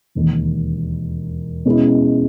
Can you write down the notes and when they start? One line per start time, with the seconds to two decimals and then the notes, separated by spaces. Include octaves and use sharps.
0.15 E1 D#2 D#3
1.65 B2 G#3 C#4 E4